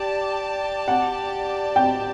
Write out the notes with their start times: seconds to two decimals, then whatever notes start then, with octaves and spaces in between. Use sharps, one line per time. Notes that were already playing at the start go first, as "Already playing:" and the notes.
Already playing: G4 D5 A5
0.88 F#5
1.76 G5